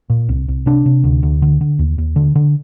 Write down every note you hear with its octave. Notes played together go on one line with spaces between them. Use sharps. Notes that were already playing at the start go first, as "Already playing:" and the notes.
A#2
C2
C2
C3 D4
C3
D2
D2
D3
D3
D#2
D#2
D3
D3